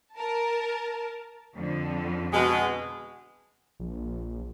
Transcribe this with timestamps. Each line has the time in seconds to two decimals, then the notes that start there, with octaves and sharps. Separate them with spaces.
0.15 A#4 A5
1.55 F2 D3
2.33 B2 G#3
3.80 A#1